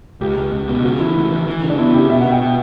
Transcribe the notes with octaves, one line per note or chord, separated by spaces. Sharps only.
C#2 G4
C#2
C#2
B2
C#3 F#4
E3 E4
D2
E3
E3
C#3
D4
B3 E4
C#3 G4
B2 E5
F#5
B2
G5
B2